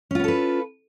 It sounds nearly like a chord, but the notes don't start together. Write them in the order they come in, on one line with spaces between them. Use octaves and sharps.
C#4 F4 B3 A4 B4